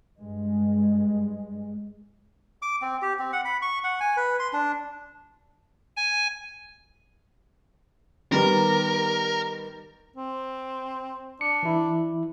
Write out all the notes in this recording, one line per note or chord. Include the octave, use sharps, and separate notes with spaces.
G2 G#3
D6
C4
G4
C4
F#5
B5
C#6
F#5
G#5
B4
C6
D4
G#5
D#3 G3 B3 A#4
C4
D4 C#7
E3 E4